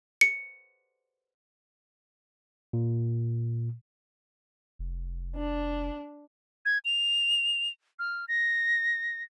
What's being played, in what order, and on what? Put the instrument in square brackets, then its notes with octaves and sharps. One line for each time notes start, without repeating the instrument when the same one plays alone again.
[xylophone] C#7
[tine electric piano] A#2
[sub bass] F1
[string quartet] D4
[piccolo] G#6
F7
F6
A#6